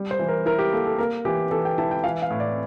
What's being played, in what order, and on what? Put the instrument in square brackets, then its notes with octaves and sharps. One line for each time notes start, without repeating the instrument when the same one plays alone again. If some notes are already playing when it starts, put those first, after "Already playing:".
Already playing: [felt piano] G3
[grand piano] C5
[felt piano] E3
[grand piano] A#4
[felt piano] E4 [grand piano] A#4
[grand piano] G4
[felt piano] A#3 [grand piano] A4
[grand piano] A4
[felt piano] A#3 [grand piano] A#4
[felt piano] E3 [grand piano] G4
[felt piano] E3 [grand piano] A4
[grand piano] G5
[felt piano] E4 [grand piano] A5
[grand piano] G5
[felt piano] E3 [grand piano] F5
[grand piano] F5
[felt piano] A2
[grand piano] D5